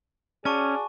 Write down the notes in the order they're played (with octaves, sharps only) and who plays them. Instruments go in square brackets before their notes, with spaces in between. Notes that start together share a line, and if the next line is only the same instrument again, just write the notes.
[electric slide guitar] C#4 [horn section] F#4 G#4 D5 [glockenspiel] G#5 A5 C#6